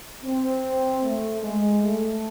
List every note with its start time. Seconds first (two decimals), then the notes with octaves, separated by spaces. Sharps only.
0.24 C4
1.03 A3
1.43 G#3
1.82 A3